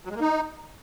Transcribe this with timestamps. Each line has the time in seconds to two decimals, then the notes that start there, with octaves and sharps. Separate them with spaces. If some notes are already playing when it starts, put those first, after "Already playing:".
0.05 F#3
0.11 G#3
0.16 A#3
0.21 D#4